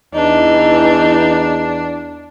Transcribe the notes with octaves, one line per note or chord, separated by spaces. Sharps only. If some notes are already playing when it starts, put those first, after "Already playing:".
E2 E3 D4 D#4